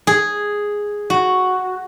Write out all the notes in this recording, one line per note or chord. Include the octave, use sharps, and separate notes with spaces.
G#4
F#4